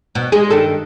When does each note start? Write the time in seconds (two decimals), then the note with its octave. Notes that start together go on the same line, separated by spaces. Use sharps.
0.15 B2
0.32 G#3 G#4
0.50 G2 D#3 A4